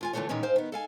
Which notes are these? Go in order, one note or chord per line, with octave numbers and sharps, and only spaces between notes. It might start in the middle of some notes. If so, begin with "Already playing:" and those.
D#2 F4 G#5
D3 E3 G#3 A3 F4 C#5
A#2 D#3 E3 G#3 C#4 B4
G#2 C5 F5 G5
D#3 B3
A4 F5 G#5